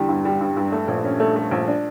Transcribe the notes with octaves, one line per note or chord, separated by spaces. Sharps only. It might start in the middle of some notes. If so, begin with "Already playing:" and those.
Already playing: E2 D3 G3
G2
G3
G2
G2
A3
A#1
C#4
A3
A3
A#1
D4